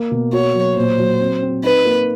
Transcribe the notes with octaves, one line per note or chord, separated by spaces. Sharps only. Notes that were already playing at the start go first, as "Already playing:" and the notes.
Already playing: A#3
B2
F#4 C#5
F#3
A#2 C5
F#3
C4
C4
D#4 B4
A#3